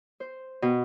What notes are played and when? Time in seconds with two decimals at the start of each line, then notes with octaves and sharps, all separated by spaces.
0.20 C5
0.62 B2